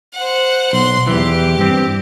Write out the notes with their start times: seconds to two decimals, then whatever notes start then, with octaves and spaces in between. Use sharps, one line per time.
0.14 C5 F#5
0.73 B1 C6
1.07 E2 E3 G4
1.58 G2 C4